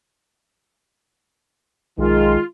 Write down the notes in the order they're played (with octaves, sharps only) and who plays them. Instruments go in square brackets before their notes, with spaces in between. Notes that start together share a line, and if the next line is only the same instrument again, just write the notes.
[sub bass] B1 [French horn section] D#3 G#3 [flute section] F4